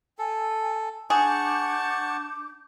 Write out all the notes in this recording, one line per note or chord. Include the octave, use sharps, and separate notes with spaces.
A4 G#5
D4 G#4 F#5 A5 C#6 D6 G6